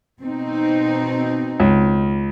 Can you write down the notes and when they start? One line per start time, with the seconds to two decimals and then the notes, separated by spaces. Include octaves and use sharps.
0.23 B2 C4 D#4
1.60 C#2